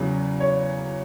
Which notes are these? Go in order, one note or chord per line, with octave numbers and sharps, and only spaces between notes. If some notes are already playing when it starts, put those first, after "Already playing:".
Already playing: E2 C#3 F#3
C#5